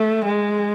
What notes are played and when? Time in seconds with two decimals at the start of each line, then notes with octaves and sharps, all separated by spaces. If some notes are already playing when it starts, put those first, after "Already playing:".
Already playing: A3
0.25 G#3